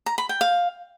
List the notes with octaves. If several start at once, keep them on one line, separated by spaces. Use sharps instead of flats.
A#5
B5
G5
F5